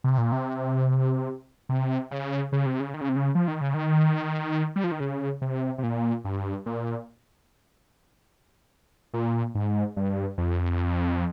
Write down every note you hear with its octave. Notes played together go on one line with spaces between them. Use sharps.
C3
A#2
C3
C3
C#3
C#3
C3
C#3
D#3
C#3
C3
C#3
F3
D#3
C#3
D#3
G3
F3
D#3
C#3
C3
C3
A#2
G2
A#2
A#2
G#2
G2
F2